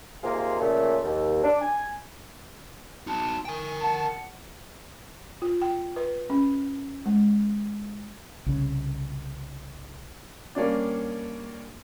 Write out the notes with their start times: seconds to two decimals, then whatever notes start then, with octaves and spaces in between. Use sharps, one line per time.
0.23 D#2 C3 A#3 F4 G#4 F5
0.59 A#2 C#3 A3
1.03 D#2
1.43 D4
1.61 G#5
3.07 D#4 F#4 A5
3.45 A#4 G5 G#5
3.81 F#5 A5
5.42 F4
5.61 G5
5.96 B4
6.30 C#4
7.06 G#3
8.46 C2 C#3
10.55 G3 A#3 C#4 D4 D5